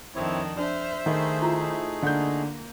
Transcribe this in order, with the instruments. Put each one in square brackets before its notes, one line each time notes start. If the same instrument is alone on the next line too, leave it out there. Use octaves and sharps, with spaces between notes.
[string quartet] F2 D#3 D4 [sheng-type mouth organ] C4 E4 C#5
[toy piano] D4 D5 [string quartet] C5 E5 [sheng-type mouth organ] F6
[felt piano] D#3 [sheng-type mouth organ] A3 D#4 G#4
[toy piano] E4 F4
[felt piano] D3 G6 [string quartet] A#3